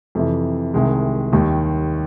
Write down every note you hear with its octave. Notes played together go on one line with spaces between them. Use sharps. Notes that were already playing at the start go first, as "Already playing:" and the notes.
F2 C3 E3
C2 C3 D#3 G#3
D#2 D#3 G3